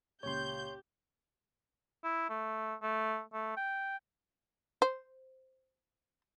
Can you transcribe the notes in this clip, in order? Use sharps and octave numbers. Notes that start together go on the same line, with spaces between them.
C#2 A#2 G4 C#5 C6 G6
E4
A3
A3
A3
G5
C5